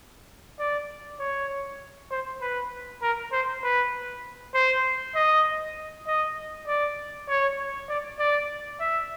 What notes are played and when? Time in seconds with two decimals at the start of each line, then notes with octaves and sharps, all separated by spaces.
0.60 D5
1.20 C#5
2.11 C5
2.42 B4
3.03 A#4
3.32 C5
3.63 B4
4.55 C5
5.16 D#5
6.07 D#5
6.68 D5
7.29 C#5
7.89 D5
8.20 D5
8.80 E5